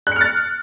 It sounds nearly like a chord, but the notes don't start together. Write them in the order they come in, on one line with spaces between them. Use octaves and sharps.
F#6 C#7 F6 A6